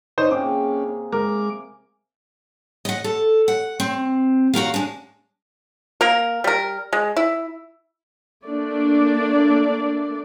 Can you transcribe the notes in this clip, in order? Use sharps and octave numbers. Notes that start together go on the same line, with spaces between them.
D#4 C5 C#5 D#5
C3 A#3 C#4 G#4 D6
G#3 A#4 D6
D#5 F#5
A4
F#5
C4
F#4 G4 A#4 F5
G#3 D4
A#3 A#4
G3 A#4
G#3
E4
A3 A#3 D4 D5